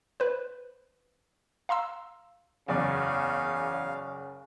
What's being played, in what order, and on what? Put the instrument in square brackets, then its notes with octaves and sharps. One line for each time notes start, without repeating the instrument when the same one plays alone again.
[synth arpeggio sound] B4 C5
F5 A#5 C6 E6
[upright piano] F#1 D5 [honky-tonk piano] E2 [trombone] C#3 [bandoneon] F5